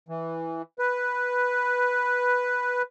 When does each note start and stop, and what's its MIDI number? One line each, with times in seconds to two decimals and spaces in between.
0.09 0.62 52
0.79 2.82 71